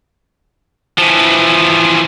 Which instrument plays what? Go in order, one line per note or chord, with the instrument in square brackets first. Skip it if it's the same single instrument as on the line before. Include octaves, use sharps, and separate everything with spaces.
[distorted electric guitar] E3 F3